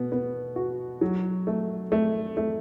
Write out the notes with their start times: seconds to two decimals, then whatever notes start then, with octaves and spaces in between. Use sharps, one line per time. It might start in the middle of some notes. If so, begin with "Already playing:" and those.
Already playing: B2 B3
0.12 B3
0.56 F#4
1.01 F#3
1.47 A3
1.92 A3
2.37 A3